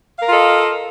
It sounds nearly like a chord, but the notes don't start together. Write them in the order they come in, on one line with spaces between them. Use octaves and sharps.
F5 A#4 F4 A4 D#5